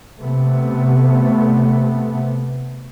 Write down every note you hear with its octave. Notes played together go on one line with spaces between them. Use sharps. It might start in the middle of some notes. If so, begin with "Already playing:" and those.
C3 A3 B3